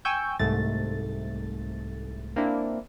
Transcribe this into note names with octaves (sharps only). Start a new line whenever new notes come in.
G5 G#5 C#6 E6 G6
C2 G#2 A3 A6
A#3 C4 D4 E4